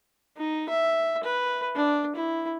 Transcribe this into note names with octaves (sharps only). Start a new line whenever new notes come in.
D#4
E5
B4
D4
E4